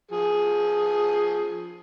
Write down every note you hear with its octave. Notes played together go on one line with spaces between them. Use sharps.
F3 G#4